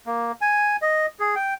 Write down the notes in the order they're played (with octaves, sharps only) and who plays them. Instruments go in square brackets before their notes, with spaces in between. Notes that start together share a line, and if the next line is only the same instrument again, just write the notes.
[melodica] A#3
G#5
D#5
G#4
G5